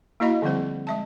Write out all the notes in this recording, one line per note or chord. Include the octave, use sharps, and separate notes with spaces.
A#3 E4 F#4 D#5 F5 B5
D3 F3 G3 C4 C5
G#3 E5 A5